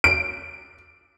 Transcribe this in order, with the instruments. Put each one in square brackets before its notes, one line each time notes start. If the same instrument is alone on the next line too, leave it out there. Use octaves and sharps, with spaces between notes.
[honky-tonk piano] D7